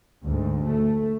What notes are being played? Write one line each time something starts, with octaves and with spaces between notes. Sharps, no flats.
D2 G#2
A3